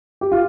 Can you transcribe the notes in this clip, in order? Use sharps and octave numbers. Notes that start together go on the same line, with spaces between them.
G4
F4